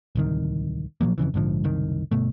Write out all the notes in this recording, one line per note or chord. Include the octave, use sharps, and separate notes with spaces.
D1 C2 D#3
A#2 F3 F#3 A#3
F2 A#2 C#3 E3
A#1 G#2 D3 F3
F#1 C2 D#3
G1 B2 A3